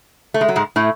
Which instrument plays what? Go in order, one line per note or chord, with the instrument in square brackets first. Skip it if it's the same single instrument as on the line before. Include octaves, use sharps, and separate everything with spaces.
[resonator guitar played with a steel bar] A3
G#3
F#3
G#2 G#3
A2 A3